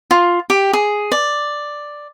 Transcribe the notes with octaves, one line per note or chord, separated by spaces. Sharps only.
F4
G4
G#4
D5